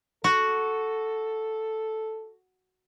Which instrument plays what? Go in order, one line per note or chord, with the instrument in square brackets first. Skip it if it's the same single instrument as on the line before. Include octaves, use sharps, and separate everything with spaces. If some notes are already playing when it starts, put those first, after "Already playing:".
[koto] F#4 [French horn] A4